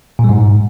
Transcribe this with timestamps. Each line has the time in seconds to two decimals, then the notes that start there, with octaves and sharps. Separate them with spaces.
0.19 A#2
0.24 G3
0.29 G#2